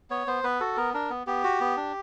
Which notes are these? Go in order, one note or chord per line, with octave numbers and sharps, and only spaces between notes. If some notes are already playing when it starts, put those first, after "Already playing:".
B3 C#5
B3 C5
B3 B4
F#4 A4
B3 A#4
D4 A#4
B3
B3 G4
F#4
B3
D4